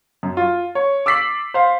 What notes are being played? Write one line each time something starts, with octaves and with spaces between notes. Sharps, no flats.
F#2
F4
C#5
D6 E6 A6 B6 C7 F#7
C5 F5